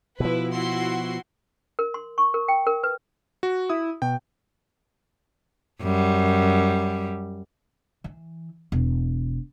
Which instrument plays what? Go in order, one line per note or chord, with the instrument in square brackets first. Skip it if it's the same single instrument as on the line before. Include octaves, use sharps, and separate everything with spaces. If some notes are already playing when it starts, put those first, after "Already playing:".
[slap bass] B2 F3 [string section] E4 B4
[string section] E4 F#4 C6
[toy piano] A#4
C6
C#6
A#4
G5
A#4
B4
[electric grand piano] F#4
[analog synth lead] E4 [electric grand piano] D#6
[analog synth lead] B2 [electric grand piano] G5
[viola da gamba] F#2 G3
[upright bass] E3
E1